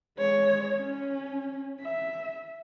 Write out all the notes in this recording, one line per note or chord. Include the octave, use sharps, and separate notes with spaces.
G#3 C#5
C#4
E5